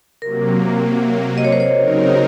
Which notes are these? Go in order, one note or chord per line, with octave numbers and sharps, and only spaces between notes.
C3 F#3 A#3 A#4
D#5
C#5
C5
C#5
C#3 F#3 C4 D#4 A#4